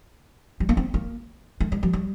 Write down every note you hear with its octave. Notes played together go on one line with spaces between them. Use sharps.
G3
A#3
C4
A#3
A3
G3
F#3
G3